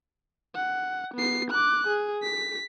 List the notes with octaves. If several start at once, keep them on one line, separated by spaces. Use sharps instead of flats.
F#5
B3 C7
D6 F#6
G#4
B6